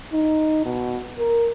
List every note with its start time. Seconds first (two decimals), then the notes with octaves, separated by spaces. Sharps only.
0.13 D#4
0.65 B2
1.19 A#4